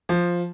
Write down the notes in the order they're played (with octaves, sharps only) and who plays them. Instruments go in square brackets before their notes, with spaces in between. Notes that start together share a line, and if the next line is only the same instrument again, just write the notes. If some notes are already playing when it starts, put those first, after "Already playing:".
[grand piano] F3